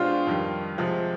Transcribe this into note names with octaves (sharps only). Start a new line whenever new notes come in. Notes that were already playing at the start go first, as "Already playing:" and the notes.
Already playing: B2 G#3 D4 F4 G4 C5
F2 D#3 G3
C3 F3 G#3